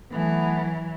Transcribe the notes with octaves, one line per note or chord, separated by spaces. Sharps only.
E3 F#3 A3 B3